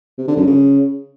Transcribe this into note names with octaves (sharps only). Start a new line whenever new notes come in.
C3
D3
F#2
C#3